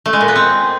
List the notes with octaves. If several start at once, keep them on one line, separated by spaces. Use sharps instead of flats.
A3
G#3
A#2
B3
C4